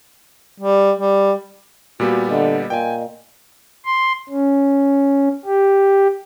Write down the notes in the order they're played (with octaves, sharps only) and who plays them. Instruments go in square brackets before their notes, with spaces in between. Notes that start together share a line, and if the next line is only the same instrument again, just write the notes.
[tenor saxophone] G3
G3
[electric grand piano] A#2 G3 B3 [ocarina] F#4
[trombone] D3 [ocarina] D#5
[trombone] A#2 [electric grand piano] G5 G#5
[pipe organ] C6
C#4
G4